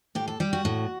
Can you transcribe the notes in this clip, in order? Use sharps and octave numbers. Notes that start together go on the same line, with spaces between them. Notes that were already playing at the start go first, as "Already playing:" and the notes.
A2 G4
A4
G3 G4
F#4
A2